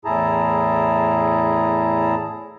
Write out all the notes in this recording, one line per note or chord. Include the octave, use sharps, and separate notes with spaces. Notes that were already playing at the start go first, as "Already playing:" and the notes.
E2 A2 E4 G#4 A5 A#5